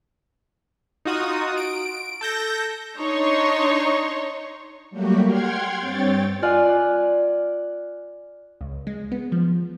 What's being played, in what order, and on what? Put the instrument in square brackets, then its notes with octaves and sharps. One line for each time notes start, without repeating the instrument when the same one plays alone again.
[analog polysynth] D#4 F4 F#4 D#6
D7
A4 G6 A#6
[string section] D4 D#4 C#5 A#5 C6 C#6
[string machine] F#3 G3 A3 A#3 F#4 G4
F#5 G5 C6 F6 G#6
G2 C4 C#5 G5 A6
[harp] F4 D5 F5 F#5 G#5
D5
[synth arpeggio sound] C#2
G#3
B3
F3